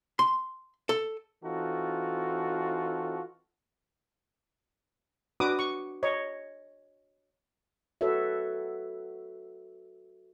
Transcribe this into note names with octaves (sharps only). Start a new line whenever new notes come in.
C6
A4
E3 C4 D#4 F4 F#4 A4
D4 F#4 B4 D6 D#6
C#6
C#5 D#5
F#4 A4 B4 C#5 E5